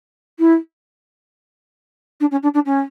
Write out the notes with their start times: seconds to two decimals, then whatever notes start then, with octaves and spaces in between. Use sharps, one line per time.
0.39 E4
2.20 D4
2.31 C#4
2.43 D4
2.54 D4
2.65 C#4